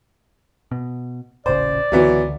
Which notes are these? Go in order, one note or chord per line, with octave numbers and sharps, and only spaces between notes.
B2
D#1 A1 C#3 C5 D5
C#2 B2 D3 E3 F#3